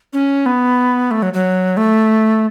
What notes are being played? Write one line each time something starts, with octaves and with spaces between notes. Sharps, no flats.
C#4
B3
A3
F#3
F#3
A3